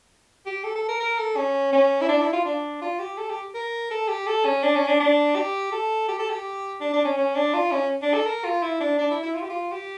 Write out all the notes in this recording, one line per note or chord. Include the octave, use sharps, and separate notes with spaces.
G4
A4
A4
A#4
A#4
A4
C#4
C#4
E4
D4
E4
F4
D4
F4
G4
A4
G4
A#4
A4
G4
A4
C#4
D4
C#4
D4
D4
G4
A4
G4
A4
G4
D4
D4
C#4
C#4
D4
F4
C#4
D4
A4
A#4
F4
E4
D4
D4
E4
E4
F4
G4
F4
G4